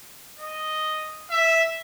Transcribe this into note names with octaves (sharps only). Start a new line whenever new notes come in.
D#5
E5